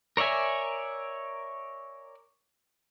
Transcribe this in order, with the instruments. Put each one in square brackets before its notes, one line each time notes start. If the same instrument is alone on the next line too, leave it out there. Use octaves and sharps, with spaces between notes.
[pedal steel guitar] A#4 C#5 D5 E5 G#5